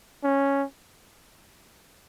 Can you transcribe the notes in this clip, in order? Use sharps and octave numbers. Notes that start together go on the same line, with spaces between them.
C#4